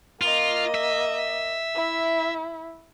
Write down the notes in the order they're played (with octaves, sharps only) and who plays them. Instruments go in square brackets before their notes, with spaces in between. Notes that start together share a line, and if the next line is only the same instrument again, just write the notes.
[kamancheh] A#3 D#5 [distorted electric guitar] F4
[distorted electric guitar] E5
[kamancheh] E4